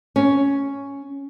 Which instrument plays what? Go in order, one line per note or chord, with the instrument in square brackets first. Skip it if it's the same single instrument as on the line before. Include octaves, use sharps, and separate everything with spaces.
[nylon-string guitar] C#4